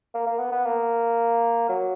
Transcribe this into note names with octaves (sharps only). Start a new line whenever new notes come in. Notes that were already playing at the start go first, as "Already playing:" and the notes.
A#3
A#3
B3
B3
A#3
F#3